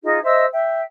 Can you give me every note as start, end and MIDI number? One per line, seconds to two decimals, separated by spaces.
0.03 0.19 63
0.03 0.19 65
0.03 0.19 68
0.03 0.19 75
0.23 0.45 72
0.23 0.45 75
0.23 0.45 76
0.23 0.45 88
0.52 0.82 76
0.52 0.82 79